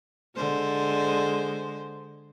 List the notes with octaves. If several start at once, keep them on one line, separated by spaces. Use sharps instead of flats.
D3 G#3 C5